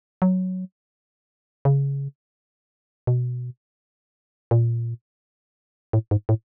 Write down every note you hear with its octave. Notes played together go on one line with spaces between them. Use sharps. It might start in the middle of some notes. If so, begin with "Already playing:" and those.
F#3
C#3
B2
A#2
A2
G#2
A2